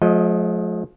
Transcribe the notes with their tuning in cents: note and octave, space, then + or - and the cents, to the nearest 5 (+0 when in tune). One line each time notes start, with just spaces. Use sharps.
F3 +35 A3 -45 D#5 +0